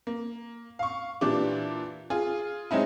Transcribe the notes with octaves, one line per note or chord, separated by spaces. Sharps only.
A#3
F5 C#6
A#2 E3 D4 G4 D6
F4 G#4
G#3 C4 C#4 D#4 E4